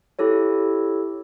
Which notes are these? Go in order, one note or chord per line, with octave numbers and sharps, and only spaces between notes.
E4 G4 A4 C#5